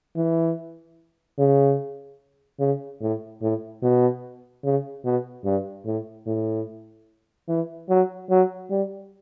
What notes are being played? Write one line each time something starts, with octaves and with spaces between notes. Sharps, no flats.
E3
C#3
C#3
A2
A2
B2
C#3
B2
G2
A2
A2
E3
F#3
F#3
G3